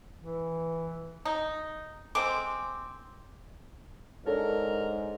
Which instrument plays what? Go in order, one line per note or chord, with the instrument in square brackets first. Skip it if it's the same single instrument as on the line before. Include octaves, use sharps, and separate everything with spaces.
[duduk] E3
[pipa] D#4
[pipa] G#3 C4 [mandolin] D6
[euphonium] G#2 [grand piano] D4 A4 C#5 [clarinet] A#4